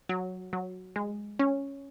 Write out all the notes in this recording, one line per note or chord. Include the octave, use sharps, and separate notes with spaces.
F#3
F#3
G#3
C#4